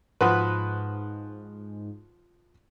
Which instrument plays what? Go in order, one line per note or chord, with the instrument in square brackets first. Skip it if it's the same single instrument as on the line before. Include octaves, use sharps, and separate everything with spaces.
[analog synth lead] G#2 [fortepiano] F3 F#4 B4 [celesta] C6 D#6 F#6